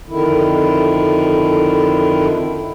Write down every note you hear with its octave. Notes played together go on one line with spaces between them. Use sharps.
F2 D3 D#3 E4